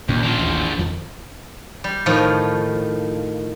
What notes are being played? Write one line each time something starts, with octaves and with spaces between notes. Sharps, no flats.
D#2 A#2 C#4
F3 D4
A1 D#2
F2 D#3
G3
A2 D#3 F3